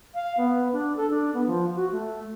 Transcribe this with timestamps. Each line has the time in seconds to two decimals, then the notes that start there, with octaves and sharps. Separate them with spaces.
0.15 F5
0.37 B3
0.73 D4
0.96 A4
1.10 D4
1.34 B3
1.47 F3
1.76 F#4
1.92 A3